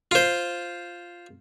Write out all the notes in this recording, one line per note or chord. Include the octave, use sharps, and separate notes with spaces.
F4 C5